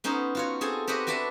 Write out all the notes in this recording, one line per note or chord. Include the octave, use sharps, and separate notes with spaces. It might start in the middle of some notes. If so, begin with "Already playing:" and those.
B3 C#4 D#4 C5
F4 F#4 C#5
C4 G#4 A4 G#5
C4 F#4 G4 B4 D#5 F#5
D4 F#4 B4 D5 E5 A5